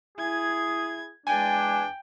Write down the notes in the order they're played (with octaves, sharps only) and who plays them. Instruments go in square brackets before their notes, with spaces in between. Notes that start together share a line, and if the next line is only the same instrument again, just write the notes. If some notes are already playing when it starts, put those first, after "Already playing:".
[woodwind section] E4 G#4 [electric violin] G#6
[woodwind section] E2 G#3 D4 [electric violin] G5 [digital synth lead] G#5